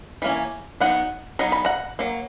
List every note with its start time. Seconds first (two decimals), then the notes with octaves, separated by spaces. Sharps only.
0.22 E3 A#3 C#4
0.80 F#3 B3 D#4 F#5
1.39 F#3 B3 D#4 A#5
1.52 B5
1.65 F#5 A#5
1.99 F#3 A#3